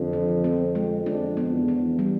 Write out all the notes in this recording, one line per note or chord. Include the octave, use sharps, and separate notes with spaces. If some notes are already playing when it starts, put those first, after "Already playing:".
Already playing: F2 D3
F3
C4
G#3
F2 D4
B3
E2
E3
G3